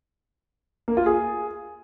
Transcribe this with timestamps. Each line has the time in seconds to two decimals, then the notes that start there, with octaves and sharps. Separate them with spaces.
0.88 A#3
0.97 F4
1.06 G#4